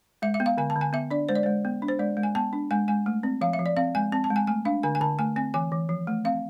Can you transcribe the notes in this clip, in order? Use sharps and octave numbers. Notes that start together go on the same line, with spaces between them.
G#3 E5
E5
B3
F5
D3 G#5
A5
D3
G#5
B3 E5
D4 D5
G#3 C5
D5
G#3 C5
B3
D4
C5
G#3 D5
G#3
G#5
B3 A5
D4
G#3 G#5
G#3 G#5
A3
C4
F3 F5
E5
F3
D5
C4 F5
G#3 G#5
C4 A5
A5
G#3
G#5
A3 G#5
D4 F5
D3 G#5
G#5
D3 A5
A3 G#5
C4 G#5
E3 G#5
E3
F3
A3
C4 F5